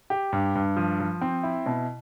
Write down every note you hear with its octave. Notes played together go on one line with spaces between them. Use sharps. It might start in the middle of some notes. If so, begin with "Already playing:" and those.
G4
G2
G2
F3
F3
C4
E4
B2